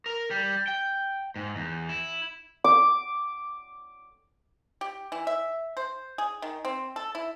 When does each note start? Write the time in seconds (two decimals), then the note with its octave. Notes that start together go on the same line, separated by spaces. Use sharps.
0.06 A#4
0.31 G3
0.68 G5
1.36 G#2
1.56 E2
1.89 E4
2.64 D6
4.81 G4
5.12 E3
5.27 E5
5.77 C5
6.18 G#4
6.42 D#3
6.65 C4
6.96 A4
7.15 E4